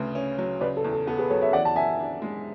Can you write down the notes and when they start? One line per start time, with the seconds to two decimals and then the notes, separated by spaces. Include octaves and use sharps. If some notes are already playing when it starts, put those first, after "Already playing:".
Already playing: D2 C#3 B4
0.15 C#4
0.38 F#3
0.61 C#3 B4 D5
0.77 A4
0.84 E2
0.92 A4
1.07 B3 A4
1.18 G#4 B4
1.30 F#3 A4 C#5
1.42 C#5 E5
1.53 E3 D5 F#5
1.65 A5
1.76 F#2 E5 G#5
1.99 D4
2.22 G#3